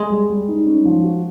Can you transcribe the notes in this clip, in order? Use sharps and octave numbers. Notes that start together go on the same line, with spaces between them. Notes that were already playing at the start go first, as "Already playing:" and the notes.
Already playing: G#3
G3
G3
D#4
C#4
F3
F#4